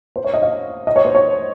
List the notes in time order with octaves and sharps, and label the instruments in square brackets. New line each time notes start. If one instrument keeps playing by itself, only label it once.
[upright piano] C5
C#5
D#5
F5
D#5
C#5
C5
C#5